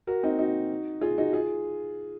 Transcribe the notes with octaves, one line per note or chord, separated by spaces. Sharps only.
F#4 A#4
C4 D#4
D#4 F#4
F4 G#4
D#4 F#4
F4 G#4